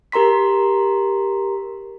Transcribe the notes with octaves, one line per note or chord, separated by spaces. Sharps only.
G4 A#4 A#5 C6 B6